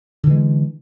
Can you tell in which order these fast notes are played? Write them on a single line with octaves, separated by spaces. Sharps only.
D3 E3 G#3